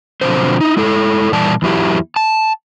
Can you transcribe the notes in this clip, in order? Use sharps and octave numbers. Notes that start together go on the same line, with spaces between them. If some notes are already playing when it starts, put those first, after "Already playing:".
B2 D3 F3 F#3 C4 C5
D#4 E4
G#3 E4 A4
A#2 E3 G3 D5 A5
E2 F#3 E4 G4
A5